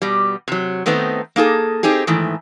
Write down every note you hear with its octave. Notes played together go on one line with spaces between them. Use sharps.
B2 G3
C3 F#3
D#3 A3 B3 C4 D#4
A#3 D#4 G#4 A4
C4 D#4 G4 G#4
G#2 D#3 E3 A3